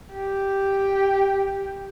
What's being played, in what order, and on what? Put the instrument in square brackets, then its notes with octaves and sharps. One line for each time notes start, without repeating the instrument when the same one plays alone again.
[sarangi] G4